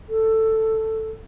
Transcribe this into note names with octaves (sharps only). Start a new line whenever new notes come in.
A4